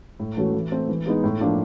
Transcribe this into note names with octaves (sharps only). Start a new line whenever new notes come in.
A2
E3 A3 C#4 F#4
E3
A3 C4
E3
G#3 B3 D#4
A2
F3 A#3 D4 F4